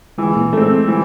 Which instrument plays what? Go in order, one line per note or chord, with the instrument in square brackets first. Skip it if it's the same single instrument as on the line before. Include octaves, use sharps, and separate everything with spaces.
[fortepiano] E3 [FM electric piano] G#3
[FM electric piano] A#2 A#3
[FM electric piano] G#3 [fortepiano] A3 C4
[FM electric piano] G#3
[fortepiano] E3 [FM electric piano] G3